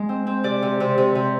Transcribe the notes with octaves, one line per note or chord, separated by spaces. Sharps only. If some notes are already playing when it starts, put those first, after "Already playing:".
Already playing: G#3
C4
C4
C3 D5
C3
C3
C3
C3